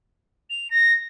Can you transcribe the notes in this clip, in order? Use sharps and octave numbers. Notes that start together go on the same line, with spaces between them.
F7
A#6